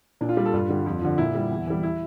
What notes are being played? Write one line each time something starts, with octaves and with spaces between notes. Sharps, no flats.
A#2 D4
F4
G3 G4
A4
G2 F4
D3 G3
F2
D3 F3
A#2 E4
G3
E2
E3 G3
E4